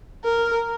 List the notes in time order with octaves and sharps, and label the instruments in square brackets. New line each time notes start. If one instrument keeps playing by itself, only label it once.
[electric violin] A#4